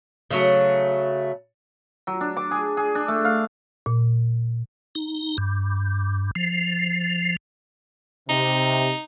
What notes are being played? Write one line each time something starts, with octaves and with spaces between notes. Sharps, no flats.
C#3 F#3 A3
F#3
D4
D6
G#4
G#4
D4
A3
F5
A#2
D#4
G2
F3
C3 D#4